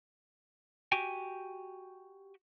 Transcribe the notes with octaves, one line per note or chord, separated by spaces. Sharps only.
F#4 G4 G5 G#5